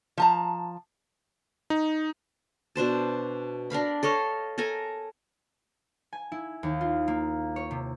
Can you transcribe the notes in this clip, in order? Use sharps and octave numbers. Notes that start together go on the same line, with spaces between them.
F3 A5 A#5
D#4
B2 D4 C5 A5
D4 A#4 F5 B5
A4 C#5 D#5 F5
A4 A#4 G#5 A#5
G#5
E4
D#2
F4
A#3
C#5
C3